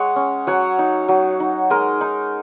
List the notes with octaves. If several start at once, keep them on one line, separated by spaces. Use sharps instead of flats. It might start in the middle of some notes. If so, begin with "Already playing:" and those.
Already playing: G#3 C#5 D#5 F#5
C#4
F#3 C#5 F#5
D#4
F#3
D#4
G#3 A#4 D#5
D#4